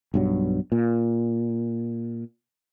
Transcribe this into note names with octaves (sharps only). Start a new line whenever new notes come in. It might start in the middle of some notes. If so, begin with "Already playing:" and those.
B1 G2 F#3
A#2